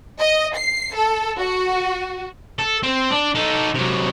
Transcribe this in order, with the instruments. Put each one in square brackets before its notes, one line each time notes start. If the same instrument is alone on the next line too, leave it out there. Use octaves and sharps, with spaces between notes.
[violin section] D#5
C7
A4
F#4
[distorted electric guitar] A4
C4
D4
D#4 A4
C3 F#3